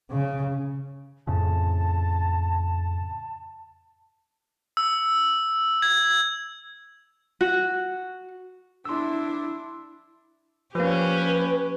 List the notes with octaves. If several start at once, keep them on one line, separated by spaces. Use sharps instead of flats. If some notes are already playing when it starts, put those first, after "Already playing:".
C#3
F2 A2 C#3 A5
E6
G#6
F#4
D4 E4 C6 E6
F3 A#3 C#4 G4 B4